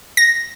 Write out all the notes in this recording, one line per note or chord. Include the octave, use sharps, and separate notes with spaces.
A#6